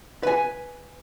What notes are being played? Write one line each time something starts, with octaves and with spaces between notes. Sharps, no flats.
B4 G#5